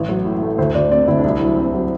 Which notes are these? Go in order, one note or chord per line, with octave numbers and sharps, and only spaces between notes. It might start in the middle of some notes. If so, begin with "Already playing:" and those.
Already playing: A1
F#3
A2
A3
D2 C5
D2 D5
C4 D5
D2 E4
D4
C2
E4
F#3
C4
F#3